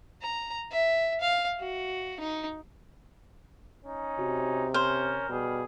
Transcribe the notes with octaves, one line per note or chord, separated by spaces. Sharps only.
A#5
E5
F5
F#4
D#4
C#4 D#4
C3 F#4
C#4 A#4 C5 F6
B2 G3 G#4